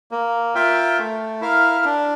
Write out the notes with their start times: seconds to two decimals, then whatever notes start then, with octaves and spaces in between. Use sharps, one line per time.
0.11 A#3
0.55 F4 A#4 E5 G5
0.98 A3
1.41 E4 A#4 F5
1.85 D4